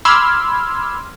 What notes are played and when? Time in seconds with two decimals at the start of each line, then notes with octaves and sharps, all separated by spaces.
0.05 B5 C6 D6 E6 F6 G#6